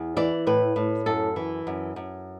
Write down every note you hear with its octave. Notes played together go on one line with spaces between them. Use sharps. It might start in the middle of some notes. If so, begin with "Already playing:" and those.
Already playing: E2
E3 D5
A2 B4
A2
F#2 A4
E3
F#2
F#2